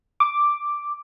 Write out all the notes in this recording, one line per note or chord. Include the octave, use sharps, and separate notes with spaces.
D6